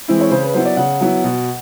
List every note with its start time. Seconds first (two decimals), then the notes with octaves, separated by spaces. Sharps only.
0.08 E3 G#3 C4 E4
0.21 C#5
0.31 C#3 C5
0.43 B4
0.54 F#3 B3 E4 C5
0.66 D5
0.77 C#3 F#5
1.01 F#3 B3 E4
1.24 B2